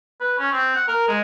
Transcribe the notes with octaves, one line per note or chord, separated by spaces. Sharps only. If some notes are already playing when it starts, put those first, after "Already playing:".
B4
C#4
C4
F#5
A#4
G#3